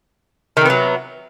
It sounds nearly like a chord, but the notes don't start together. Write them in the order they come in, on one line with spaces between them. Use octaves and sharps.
D#3 C3 B3 F#3